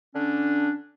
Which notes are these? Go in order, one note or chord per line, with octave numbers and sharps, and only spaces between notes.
D3 C#4 D4